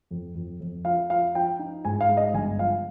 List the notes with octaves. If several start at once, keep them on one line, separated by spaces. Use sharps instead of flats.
F2
F2
F2
F3 F5
F3 F5
F3 G5
D#4
G#2 G#5
F5
G#3
D#5
G1 G#5
F3 F5